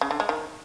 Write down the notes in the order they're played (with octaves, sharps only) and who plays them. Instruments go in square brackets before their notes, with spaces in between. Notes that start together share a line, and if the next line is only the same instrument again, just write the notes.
[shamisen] C#3
D3
G#3
D#3